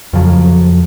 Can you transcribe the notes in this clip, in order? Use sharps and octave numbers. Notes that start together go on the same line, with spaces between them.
F2 C#3 F3 F#3